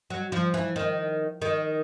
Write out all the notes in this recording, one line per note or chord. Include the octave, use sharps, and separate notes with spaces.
F#3
F3
E3
D#3
D#3